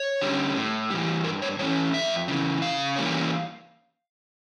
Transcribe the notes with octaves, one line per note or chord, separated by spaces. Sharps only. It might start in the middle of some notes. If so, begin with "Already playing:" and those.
Already playing: C#5
D3 G3 C#4
A2
E3 G3
G2 A#4
C#5
E3 A3 C#4 C#5
F2 E5
C#3 E3
C#3 F5
E3 G3 A#3 C#4